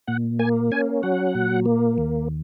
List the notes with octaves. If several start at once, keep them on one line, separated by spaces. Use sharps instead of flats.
A#2 F#5
A#3 G#5
C#4 G#5
F#3 F#5
A#2
A#3
D#2